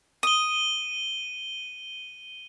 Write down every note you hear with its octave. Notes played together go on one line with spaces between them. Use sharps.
D#6 D#7 G7